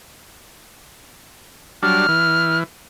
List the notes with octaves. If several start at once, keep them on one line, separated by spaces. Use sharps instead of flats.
F#3 G3 D4 F6
E3